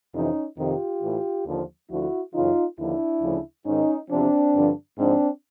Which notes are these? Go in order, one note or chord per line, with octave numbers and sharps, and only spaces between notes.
F2 C3 E3 C#4 D#4
F2 C3 D#3 F4 G4
A2 E3
D#2 D3 F3
D2 D3 F3 E4 F#4
F#2 C#3 E3 D#4 F4
D#2 D3 F3 D4 E4
D2 C#3 F3
G#2 D#3 C#4 D#4
E2 C3 F3 C4 D4
G2 D3 F3
G#2 F3 C4 D4